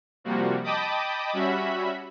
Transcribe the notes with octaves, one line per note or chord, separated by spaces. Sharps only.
C3 F3 G3 A#3 F#4
D#5 G5 A5 B5 D6 D#6
G3 C#4 F#4 E5 B5